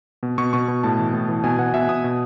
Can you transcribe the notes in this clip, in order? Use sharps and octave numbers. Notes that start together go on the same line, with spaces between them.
B2
B2 C#6
B2 C#6
B2
A2 A5
E3
A2
E3
B2 G#5
B2 F#5
B2 E5
B2 D#6
B2